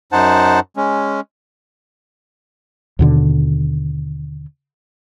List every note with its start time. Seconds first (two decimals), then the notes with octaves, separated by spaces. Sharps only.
0.12 F#2 D#4 C5 F#5 A5
0.77 G#3 C#4
2.99 D#2 B2 D3